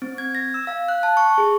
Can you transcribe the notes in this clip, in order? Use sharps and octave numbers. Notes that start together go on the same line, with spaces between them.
C4
G#6
A#6
E6
F5
F#6
A5
C#6
G#4